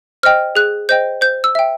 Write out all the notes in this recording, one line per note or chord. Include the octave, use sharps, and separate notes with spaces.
C5 D#5 G5 F6
G#4 F#6
C5 D#5 G5 G6
C5 G6
E6
E5 G5